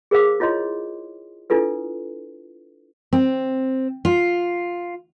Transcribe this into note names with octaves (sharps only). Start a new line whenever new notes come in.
G#4 A#4 C5 F5 D6
E4 F4 C#5 D#5 C6
D4 E4 F4 A4 B4
C4
F4